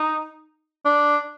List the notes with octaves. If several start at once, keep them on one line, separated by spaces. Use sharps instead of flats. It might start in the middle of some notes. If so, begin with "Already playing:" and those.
Already playing: D#4
D4